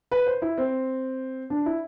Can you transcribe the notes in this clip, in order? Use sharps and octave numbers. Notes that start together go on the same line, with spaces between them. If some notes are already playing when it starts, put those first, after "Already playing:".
B4
C5
E4
C4
D4
E4